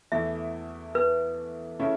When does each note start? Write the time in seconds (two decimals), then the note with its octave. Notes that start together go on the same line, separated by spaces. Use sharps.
0.12 E2 E3 A3 E4 E5
0.95 B4
1.79 C#3 A3 C#4 E4